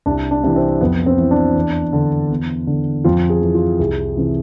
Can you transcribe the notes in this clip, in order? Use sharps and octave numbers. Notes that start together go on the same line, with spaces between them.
C2 D4
D4
C3 E3
C4
F2 B3
C4
E3
D4
E2
D3
E2
D3
F2 F4
G#4
E3
F4
C2 G#4
C3 E3